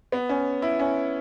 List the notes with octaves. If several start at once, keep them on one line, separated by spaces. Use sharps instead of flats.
B3
C#4
E4
C#4